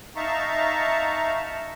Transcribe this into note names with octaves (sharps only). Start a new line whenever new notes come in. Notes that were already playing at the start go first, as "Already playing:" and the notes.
D#4 E5 F5 A5 A#5 C#6